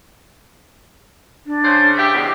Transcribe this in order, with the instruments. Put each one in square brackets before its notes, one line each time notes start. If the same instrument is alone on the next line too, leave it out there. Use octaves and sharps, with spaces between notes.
[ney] D4
[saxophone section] C#3 C5
G4 E5
[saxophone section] E2 B2 [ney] G5